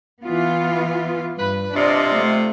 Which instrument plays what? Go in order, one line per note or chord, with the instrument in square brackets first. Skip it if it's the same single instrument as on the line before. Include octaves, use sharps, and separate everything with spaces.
[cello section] E3 B3 F4
[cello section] G2 [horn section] B4
[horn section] C3 F4 [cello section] D4 D5 D#5
[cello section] A3